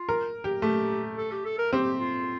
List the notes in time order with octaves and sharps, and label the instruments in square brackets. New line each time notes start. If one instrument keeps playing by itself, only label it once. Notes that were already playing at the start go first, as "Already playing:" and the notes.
Already playing: [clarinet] F4
[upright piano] A#4
G4
[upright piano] A3 [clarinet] G4
[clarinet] A4
G4
A4
A#4
[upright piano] C4 [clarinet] G4
[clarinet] F4